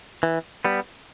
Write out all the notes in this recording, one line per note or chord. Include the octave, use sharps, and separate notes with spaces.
E3
G3 B3